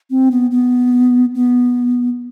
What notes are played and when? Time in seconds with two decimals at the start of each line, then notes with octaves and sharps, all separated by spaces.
0.10 C4
0.31 B3
0.51 B3
1.35 B3